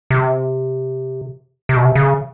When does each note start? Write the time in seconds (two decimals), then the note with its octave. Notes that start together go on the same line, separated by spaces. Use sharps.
0.11 C3
1.69 C3
1.77 B2
1.85 C3
1.95 C#3